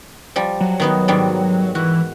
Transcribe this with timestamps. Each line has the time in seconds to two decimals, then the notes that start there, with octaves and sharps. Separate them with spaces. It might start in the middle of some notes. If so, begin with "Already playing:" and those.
0.36 F3 G3
0.61 F#3
0.80 D#3 B3 D#4
1.08 G#2 D#3 G3
1.75 E3 F#4